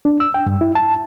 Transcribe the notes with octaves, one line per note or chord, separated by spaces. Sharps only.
D4
E6
G5
G2
E4
A5